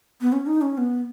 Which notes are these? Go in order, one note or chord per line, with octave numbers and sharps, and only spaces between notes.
B3
C#4
D#4
C#4
B3